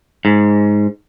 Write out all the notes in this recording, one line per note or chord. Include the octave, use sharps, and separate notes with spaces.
G#2